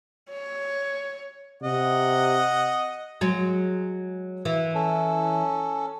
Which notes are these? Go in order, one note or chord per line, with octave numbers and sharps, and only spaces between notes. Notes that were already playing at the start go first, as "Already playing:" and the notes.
C#5
C3 D#5 F#5
F#3 G#3
E3
C#4 A4